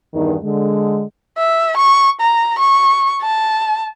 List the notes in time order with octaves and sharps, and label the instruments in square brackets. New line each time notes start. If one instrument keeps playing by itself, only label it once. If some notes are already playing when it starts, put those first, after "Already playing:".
[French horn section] E2 G2 D#3 D#4
D3 G#3
[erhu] E5
C#6
A#5
C#6
A5